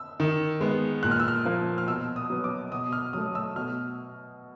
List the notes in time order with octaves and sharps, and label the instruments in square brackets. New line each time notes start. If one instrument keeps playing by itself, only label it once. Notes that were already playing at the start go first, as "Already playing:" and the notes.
Already playing: [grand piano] E6
D#3
G#3 B3
A#2 F#6
F6
E6
F6
F3 A#3
F6
B2 E6
D#6
F#3 B3
D6
B2 D#6
F6
F#3 A3 D#6
E6
B2 F6